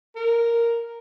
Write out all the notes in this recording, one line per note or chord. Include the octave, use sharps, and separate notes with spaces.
A#4